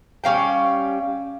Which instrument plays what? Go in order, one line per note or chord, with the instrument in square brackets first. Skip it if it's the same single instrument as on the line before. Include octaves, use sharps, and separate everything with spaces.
[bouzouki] G3 C#4 F5 G5